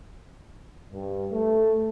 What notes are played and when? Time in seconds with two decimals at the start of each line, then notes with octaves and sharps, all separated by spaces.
0.91 G2
1.31 A3